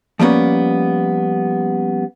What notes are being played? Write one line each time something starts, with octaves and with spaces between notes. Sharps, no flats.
F3 G3 A#3 B3 C#4